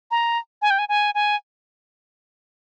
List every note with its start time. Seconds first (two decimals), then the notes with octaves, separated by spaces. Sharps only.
0.11 A#5
0.62 G#5
0.70 G5
0.79 G#5
0.89 G#5
1.15 G#5